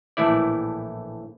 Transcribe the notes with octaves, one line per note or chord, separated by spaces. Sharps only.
A#1 A2 E3 A3 E4 D5